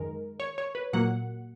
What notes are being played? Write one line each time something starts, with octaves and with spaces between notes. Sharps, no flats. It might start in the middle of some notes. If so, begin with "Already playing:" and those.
Already playing: F#2 D#3 G#3 A#4
C#5
C#5
B4
A#2 F#3 A#3 F#5